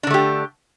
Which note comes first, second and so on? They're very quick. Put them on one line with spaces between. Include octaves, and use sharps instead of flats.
D4 D3 A3 G4